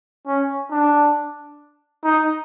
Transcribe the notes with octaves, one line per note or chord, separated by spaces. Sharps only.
C#4
D4
D#4